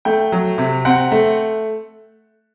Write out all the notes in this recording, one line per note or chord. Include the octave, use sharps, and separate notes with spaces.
A3 G5
F#3
C3
C4 F#5
A3